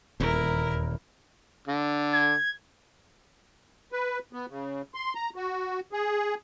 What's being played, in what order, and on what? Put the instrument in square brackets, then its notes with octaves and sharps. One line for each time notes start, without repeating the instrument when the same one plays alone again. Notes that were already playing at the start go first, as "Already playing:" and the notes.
[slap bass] D#1 E2 [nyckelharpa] E4 A#4
[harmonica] D3
[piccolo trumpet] G#6
[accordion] B4
B3
C#3
C6
A#5
F#4
G#4